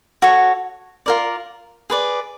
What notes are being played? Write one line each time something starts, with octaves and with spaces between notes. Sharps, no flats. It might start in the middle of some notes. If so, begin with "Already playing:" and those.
F#4 A4 C#5
F4 A#4 D5
G#4 B4 D5